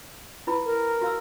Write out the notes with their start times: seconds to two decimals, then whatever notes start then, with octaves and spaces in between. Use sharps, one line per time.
0.47 E4 B4 B5
0.65 A#4
1.01 F#4 F5 E6